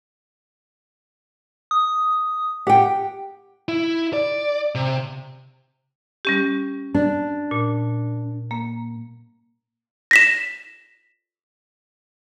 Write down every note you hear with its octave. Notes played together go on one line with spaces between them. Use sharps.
D#6
G4 F#5 G5
E4
D5
C3
G3 C#4 G4
D4
A#2
A#3
A#6 B6 E7